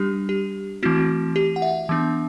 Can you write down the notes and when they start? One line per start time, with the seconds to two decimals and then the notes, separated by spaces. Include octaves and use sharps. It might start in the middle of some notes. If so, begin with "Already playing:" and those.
Already playing: G3 D4 G4
0.29 G4
0.83 E3 A3 C4 E4 F#4
1.36 G4
1.56 F#5
1.62 E5
1.89 E3 B3 D4